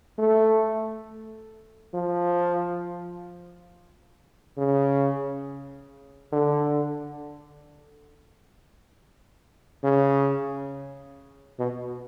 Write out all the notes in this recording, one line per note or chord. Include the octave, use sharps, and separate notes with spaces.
A3
F3
C#3
D3
C#3
B2